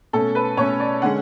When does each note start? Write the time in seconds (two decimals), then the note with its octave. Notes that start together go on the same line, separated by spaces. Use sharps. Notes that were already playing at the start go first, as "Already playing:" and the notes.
0.13 B2 A3 C#4 A4
0.35 B4
0.57 B2 A3 C#4 C#5
0.80 D5
1.02 D3 G#3 C#4 F#5